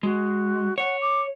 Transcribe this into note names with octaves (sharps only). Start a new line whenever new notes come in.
G#3 F#4
C#5 F#5
D6